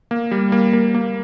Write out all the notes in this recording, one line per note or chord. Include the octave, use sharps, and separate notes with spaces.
A#3
G3
A#3
A#3
A#3